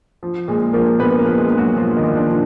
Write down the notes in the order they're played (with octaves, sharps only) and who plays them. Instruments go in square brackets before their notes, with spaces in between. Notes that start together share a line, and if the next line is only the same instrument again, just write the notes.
[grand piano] F3
A#2 G#3 G#4
F3 A#3 A#4
A#2 B3 B4
A#3 A#4
F3
G#3 G#4
A#2
F#3 F#4
F3 F4
D#3 D#4
A#2
D4
F3